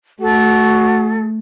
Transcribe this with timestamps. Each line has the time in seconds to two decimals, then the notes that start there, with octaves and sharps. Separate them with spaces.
0.21 A3 F#4 A4